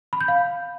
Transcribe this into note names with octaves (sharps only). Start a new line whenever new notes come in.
B5
G6
F5